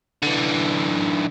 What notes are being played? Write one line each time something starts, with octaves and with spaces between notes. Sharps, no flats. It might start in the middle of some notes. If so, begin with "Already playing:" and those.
D3 E3